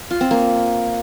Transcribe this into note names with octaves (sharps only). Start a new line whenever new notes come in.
F4
C4
A#3